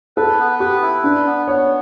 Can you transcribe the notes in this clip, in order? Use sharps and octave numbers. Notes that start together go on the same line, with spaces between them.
A4 B4
B3
G4 B4
E4
D4 B4
B3
B3 C#5